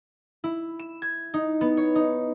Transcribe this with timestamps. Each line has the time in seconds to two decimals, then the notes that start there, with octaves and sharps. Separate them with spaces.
0.44 E4
0.79 E7
1.02 G#6
1.34 D#4
1.61 B3
1.77 C#5
1.95 D#4